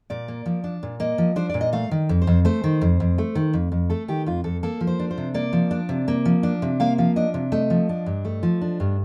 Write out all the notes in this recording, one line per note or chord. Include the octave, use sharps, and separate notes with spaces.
A#2 D5
A#3
F3
D4
A#2
A#3 D#5
F3
D4 C5
A#2 D5
D#5
A3 F5
D#3
F2
C5
F2
A3 C5
D#3
F2
F2
A3
D#3
F2
F2
A3 A4
D#3 G4
F2 F4
F2 A4
A#3 A4
F3
C5
D4
C5
C3
A#3 D5
F3
D4
C3
A#3
F3
D4
C3
A#3 F5
F3 F5
D4 D#5
C3
A3 D#5
F3
D4
G2
A3
F3
D4
G2